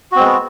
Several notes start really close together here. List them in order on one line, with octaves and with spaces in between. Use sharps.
F#4 C4 G#3 B3